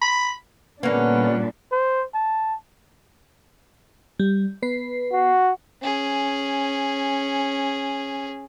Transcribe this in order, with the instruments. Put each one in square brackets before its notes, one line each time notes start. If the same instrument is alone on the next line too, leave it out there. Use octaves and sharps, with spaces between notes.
[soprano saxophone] B5
[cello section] A#2 G3 D4 [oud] D3 A#3 [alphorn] B3 [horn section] C#4 F#5
[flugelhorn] C5
A5
[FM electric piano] G3
B3 B4 C7
[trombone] F#4
[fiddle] C#4 G#4